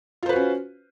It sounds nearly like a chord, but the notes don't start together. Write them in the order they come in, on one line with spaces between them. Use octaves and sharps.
F4 C5 B4 F#4 C#4